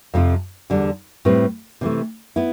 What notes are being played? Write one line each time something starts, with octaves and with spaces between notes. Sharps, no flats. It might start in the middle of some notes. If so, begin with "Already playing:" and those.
F2 C3 F3 C4
E2 D3 G3 D4
A2 G3 C4 G4 B4
C3 E3 A3
B3 E4